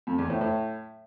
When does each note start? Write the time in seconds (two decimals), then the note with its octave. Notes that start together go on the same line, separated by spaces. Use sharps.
0.07 F2
0.18 E2
0.30 A2
0.41 A2